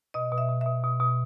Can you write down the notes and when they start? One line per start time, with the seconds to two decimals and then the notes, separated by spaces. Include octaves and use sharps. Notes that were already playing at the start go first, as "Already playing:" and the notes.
0.14 B2 D#5
0.32 B2
0.38 E5
0.49 B2
0.61 B2 E5
0.84 B2
1.00 B2